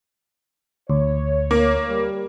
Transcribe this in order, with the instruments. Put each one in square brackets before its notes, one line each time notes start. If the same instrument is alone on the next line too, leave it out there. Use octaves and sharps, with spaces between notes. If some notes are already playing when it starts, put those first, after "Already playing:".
[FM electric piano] D2 [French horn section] C#5
[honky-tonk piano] A#3
[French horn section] G3